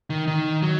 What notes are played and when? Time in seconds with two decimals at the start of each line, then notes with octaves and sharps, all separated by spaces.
0.10 D#3
0.27 D#3
0.62 F#3